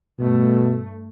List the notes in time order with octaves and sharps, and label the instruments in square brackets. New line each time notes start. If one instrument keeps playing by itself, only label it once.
[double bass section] G2 A3 [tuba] B2